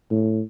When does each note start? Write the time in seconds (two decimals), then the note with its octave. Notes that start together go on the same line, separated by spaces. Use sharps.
0.11 A2